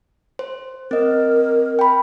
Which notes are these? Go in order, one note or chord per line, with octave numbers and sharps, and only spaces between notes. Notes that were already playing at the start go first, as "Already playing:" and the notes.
C5
C4 A#4 D#5
G5 B5